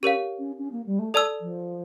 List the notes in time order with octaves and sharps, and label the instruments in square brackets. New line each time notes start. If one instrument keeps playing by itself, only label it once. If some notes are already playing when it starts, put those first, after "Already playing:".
[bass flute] C#4 [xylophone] G4 A#4 C#5 F5
[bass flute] C#4
C#4
A#3
G3
A3
[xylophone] A4 D5 A5 E6
[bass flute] F3